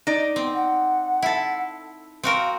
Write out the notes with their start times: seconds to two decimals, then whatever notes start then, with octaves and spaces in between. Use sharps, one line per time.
0.07 D#4 D5
0.36 B3 C4
0.53 F#5
1.22 E4 A4
2.23 C4 F#4 A#4 F5